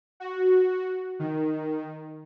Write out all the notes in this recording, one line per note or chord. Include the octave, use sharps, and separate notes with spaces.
F#4
D#3